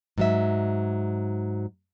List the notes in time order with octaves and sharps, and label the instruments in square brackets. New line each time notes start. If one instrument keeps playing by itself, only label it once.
[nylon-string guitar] G#2 F#3 E5